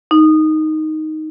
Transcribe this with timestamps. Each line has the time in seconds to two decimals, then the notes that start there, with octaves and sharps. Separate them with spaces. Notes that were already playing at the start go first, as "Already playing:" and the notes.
0.11 D#4